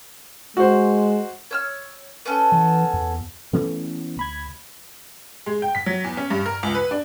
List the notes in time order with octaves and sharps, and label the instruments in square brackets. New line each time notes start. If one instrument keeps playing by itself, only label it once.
[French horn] G#3 [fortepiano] F#4 C5
[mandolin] C#5 E6 F6
B3 C#4 A4
[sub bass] E3
E2
[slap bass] E3 B3 C#4 [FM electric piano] A3
[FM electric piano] D2 B5 G#6
[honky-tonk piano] G#3
G5
B6
F#3
E2
C#4
G2
A#4
C#2
B4
D4